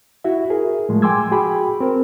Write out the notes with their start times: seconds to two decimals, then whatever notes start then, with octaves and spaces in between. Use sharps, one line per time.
0.24 E4 F#4 E5
0.50 G#4 A#4
0.89 A2 F3 G#3 A3
1.02 G5 G#5 C6 D6 E6 G#6
1.31 F#4 G#4 G5 B5
1.80 C4 A#4